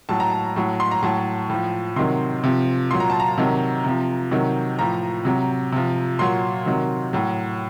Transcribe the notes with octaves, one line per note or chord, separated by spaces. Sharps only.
A2 F#3 A5
A#5
A5
A2 F#3
C6
A#5
A2 F#3 A5
A2 F3
C3 D#3 F#3 C6
C3 F3
A#2 F#3 C6
A#5
A5
A#5
C3 D#3 F#3
C3 F3
C3 D#3 F#3
A2 F3 A#5
C3 F#3
C3 F3
A#2 F#3 C6
C3 D#3 F#3
A2 F#3